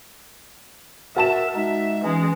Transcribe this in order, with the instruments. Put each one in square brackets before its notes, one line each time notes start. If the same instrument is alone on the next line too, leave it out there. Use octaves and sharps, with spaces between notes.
[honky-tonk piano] F#4 A5 E7 [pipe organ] A#4 [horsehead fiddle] E5
[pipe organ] G#3 D#4 [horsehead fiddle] E5
[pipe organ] E3 C#4 [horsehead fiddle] G#3